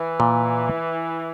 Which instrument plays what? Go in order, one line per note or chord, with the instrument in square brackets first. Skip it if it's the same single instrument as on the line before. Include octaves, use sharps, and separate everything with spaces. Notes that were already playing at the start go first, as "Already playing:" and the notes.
Already playing: [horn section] E3
[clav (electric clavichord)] A#2